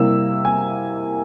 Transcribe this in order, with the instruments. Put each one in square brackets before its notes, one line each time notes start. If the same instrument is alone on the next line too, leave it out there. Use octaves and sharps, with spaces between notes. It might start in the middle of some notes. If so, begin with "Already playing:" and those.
Already playing: [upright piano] C3 G3 A#3 E4 E6
G#5